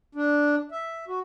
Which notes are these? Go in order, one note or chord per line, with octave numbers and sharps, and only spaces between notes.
D4
E5
F#4